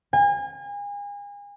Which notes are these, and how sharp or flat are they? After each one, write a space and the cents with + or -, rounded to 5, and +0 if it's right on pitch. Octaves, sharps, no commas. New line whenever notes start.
G#5 -35